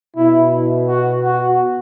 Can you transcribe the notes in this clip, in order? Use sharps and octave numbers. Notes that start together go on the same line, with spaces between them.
B2 E4
F#4
F#4